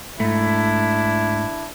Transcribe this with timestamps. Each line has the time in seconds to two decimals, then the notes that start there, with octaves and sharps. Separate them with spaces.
0.20 G#2 A3 D4 E4